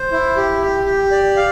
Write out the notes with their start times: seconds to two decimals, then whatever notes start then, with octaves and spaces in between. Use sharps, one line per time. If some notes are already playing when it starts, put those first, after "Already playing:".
Already playing: C5
0.12 E4
0.36 G4
0.62 G4
0.86 G4
1.12 D5
1.37 F5